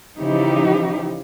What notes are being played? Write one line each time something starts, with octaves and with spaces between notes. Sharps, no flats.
C#3 E3 F3 D#4 E4 G4